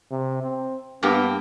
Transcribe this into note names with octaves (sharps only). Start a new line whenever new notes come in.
C3
C4
G2 A#3 B3 G4